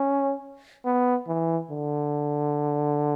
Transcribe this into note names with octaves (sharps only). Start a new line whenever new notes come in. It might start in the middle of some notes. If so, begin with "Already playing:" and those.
Already playing: C#4
B3
E3
D3